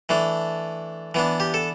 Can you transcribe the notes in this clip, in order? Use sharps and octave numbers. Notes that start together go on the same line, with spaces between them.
E3 A3 D4
E3 B3 D4
G4
A4